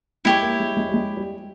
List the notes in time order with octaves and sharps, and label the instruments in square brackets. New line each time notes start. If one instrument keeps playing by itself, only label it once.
[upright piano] G#3 [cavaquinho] E4 G4 C#5
[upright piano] A#3
G#3
G#3
G3
G#3
G3